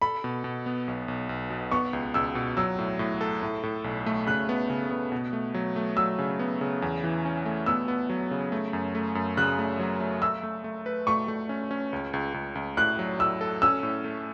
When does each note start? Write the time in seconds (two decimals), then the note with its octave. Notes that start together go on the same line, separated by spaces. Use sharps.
0.02 A4 B5
0.24 B2
0.44 B2
0.66 B3
0.88 B1
1.08 B1
1.29 B1
1.50 B2
1.71 B3 C#6
1.93 C#2
2.14 C#2 E6
2.35 B2
2.57 F#3 E6
2.79 A2
2.99 A2
3.21 A4
3.43 A2
3.63 A2
3.84 B1
4.06 A3
4.26 C#3 F#6
4.49 B3
4.70 C#3
4.90 B3
5.12 B2
5.33 A3
5.54 F#3
5.76 A3
5.97 F#3 E6
6.18 C#3
6.39 B3
6.61 C#3
6.82 E2
7.04 E3
7.25 C#4
7.45 A3
7.66 B3 E6
7.88 B3
8.09 F#3
8.31 C#3
8.52 A3
8.73 F#2
8.95 A3
9.15 F#2
9.37 C#3 F#6
9.59 A3
9.79 F#3
10.01 A3
10.22 A3 E6
10.43 A3
10.64 A3
10.86 B4
11.07 A3 C#6
11.28 A3
11.49 C#4
11.71 C#4
11.93 C#2
12.13 C#2
12.34 C#2
12.55 C#2
12.77 A2 F#6
12.99 F#3
13.19 A2 E6
13.41 A4
13.62 C#4 E6
13.83 A2
14.04 A3